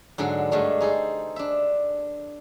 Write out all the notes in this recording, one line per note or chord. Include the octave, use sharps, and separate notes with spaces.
G#2 D3 F#3 D4
G2 G#3 A3 D4
D#4 G#4 A4 C5
D4 E5